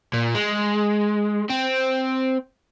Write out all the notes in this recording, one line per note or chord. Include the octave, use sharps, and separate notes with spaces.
A#2
G#3
C4